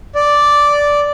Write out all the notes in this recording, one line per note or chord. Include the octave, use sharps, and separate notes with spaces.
D5